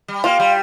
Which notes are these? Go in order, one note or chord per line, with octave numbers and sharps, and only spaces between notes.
G3
A#3 F4
G3